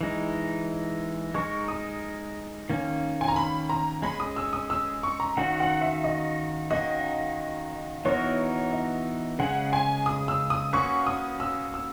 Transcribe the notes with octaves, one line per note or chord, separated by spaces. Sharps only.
E3 G#3 D#4
G#3 D#4 A#4 C#6
D#6
D#3 A#3 C#4
G#5
A#5
B5
A#5
G#3 C#4 G#4 B5
D#6
E6
D#6
E6
C#6
A#5
D#3 A#3 C#4 F#4 F#5
F#5
E5
D#5
D#3 A#3 C#4 F#4 D#5
E3 B3 D#4 F#4 A#4 C#5
D#5
C#3 G#3 C#4 G#4 F#5
G#5
D#6
E6
D#6
A#3 C#4 F#4 B4 C#6
D#6
E6
E6